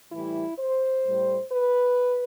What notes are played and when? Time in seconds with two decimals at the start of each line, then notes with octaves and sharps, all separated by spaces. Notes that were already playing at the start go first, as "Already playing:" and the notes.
0.11 A2 E3 G3 E4
0.58 C5
1.06 A2 G3
1.52 B4